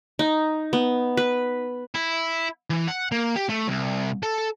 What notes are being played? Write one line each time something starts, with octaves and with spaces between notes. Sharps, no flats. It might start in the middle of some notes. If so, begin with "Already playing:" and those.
D#4
B3
B4
E4
E3
F#5
A#3
G4
A3
C2
A4